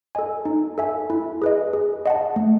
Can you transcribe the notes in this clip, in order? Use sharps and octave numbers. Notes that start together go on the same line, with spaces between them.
A4 D#5 G#5
D#4
A4 E5 G#5
E4
G#4 B4 D#5
G#4
D#5 F#5 A5
A3